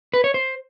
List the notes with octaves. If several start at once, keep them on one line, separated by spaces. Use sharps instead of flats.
B4
C#5
C5